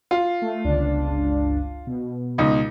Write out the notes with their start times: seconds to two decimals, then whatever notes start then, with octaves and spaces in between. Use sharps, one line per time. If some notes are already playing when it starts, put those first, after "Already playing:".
0.11 F4
0.42 A3
0.64 G1 C#2 D4
1.87 B2
2.38 C#2 D#4